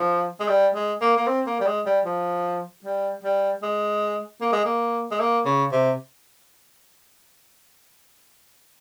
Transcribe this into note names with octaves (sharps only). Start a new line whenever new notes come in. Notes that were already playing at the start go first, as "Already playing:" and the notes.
Already playing: F3
G#3
G3
G#3
A#3
A#3
C4
A#3
G3
G#3
G3
F3
G3
G3
G#3
A#3
G#3
A#3
G#3
A#3
C#3
C3